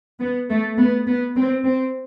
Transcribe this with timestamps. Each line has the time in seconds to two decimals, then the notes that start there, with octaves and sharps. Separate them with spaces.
0.20 B3
0.49 A3
0.78 B3
1.07 B3
1.36 C4
1.64 C4